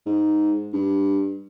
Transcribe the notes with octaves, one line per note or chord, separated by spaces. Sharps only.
G#2
G2